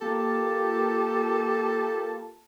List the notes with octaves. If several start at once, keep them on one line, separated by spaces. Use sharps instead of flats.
A#3 F4 G4 A4 A5